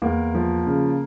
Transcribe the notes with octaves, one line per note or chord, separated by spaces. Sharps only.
E2 A#3
F3
C#3